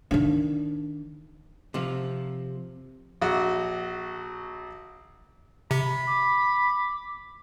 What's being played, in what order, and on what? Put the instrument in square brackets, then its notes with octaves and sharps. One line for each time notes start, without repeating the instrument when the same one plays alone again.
[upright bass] D#3 D4
[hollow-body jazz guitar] C3 F3
[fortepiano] A#1 F#4
[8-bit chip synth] C3 [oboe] B5
[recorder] D6